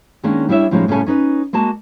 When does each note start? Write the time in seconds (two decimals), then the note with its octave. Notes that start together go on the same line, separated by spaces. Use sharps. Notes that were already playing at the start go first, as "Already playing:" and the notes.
0.23 D#3 G#3 A#3 C#4 D4
0.49 G3 D4 E4 C#5 E5
0.71 A2 F3 G3 G#3 C#4 D#4
0.88 A2 C#3 G3 C#4 A4 G#5
1.06 C#4 D#4 B4 D#5
1.53 G#3 A#3 F#4 D#5 A5